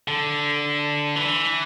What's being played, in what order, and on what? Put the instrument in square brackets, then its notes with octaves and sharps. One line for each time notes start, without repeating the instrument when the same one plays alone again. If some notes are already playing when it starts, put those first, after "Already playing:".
[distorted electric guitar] D3
E3